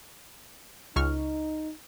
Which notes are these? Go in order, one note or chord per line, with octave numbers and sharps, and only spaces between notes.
C#2 D#4 C#6 F6